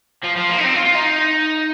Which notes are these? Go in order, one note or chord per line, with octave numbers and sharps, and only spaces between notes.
F3
F3
A#3
D#4
C4
F4
F4
D#4